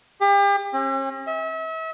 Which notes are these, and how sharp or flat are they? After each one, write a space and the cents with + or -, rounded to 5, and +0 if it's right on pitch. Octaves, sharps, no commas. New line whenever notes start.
G4 +40
C#4 -45
E5 -35